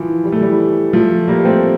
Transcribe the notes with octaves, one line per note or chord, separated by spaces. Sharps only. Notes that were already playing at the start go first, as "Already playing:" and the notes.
Already playing: E3 F3
G3
A3
E3 G3
F3 A3
G3 A#3
A3 C4